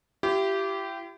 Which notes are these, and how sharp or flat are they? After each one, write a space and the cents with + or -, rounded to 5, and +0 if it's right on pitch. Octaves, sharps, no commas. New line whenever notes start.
E4 +40 G4 -15